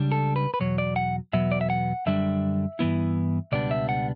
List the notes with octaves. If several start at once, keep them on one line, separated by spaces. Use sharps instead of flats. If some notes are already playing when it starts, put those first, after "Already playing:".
Already playing: C#2 C#3 G3 D4
A4
B4
B4
E2 B2 F#3 C#5
D5
F#5
E2 B2 F#3 B3 E5
D5
E5
F#5
F#2 D3 G3 D4 E5
G2 E3 B3 E4
C#2 B2 G3 B3 D4 D5
E5
F#5